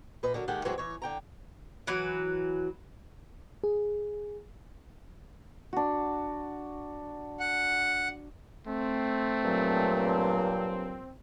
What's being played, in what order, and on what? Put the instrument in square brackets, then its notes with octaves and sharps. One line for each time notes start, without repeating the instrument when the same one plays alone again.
[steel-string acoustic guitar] A#2 B4 D#5
D3 F#3 A#4
D#2 D#3 G#3 A3 G4 F#5
E3 F#3 G#3 A3 C4 F#4
E3 C#5
D3 G5 A#5
[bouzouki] E3 F#3 B4
[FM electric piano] G#4
[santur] D4 F#4
[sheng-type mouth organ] F#5
[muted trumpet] A3 [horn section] C4
[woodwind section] G2 A#2 F#3